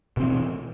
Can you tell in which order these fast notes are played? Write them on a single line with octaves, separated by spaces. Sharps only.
B2 C4 E3